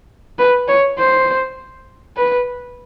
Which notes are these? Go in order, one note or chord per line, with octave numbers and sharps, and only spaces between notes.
B4
C#5
C5
B4